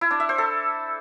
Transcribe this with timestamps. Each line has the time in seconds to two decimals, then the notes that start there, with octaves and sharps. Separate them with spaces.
0.01 E4
0.11 D4
0.20 E5
0.29 C5
0.38 A4